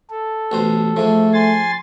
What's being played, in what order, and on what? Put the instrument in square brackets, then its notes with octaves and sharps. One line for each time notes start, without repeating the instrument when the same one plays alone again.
[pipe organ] A4
[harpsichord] A1 B2 C5
[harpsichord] G#2 F3 [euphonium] A3
[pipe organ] G#5 C6 A6